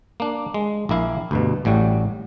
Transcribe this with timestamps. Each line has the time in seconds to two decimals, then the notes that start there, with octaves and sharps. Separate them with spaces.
0.20 A#3 D4
0.54 G#3
0.89 A#1 A#3 E4 F5
1.31 D2 G2 B2
1.65 A1 A2 G3 F#4